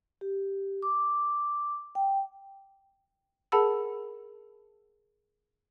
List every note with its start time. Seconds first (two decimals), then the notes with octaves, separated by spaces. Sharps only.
0.21 G4
0.82 D6
1.95 G5
3.52 G#4 A#4 F#5 A5 B5 E6